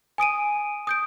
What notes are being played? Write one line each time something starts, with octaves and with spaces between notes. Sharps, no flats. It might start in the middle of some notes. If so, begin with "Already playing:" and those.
G#5 D#6 D7 D#7
D#6 G6 D7